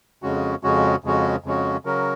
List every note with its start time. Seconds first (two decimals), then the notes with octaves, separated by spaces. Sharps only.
0.23 F2 C#3 G#3 C#4 F#4
0.63 F2 C#3 G#3 C#4 F#4
1.04 F2 C#3 G#3 C#4 F#4
1.44 F2 C#3 G#3 C#4 F#4
1.85 C#3 F#3 C#4 F#4 A#4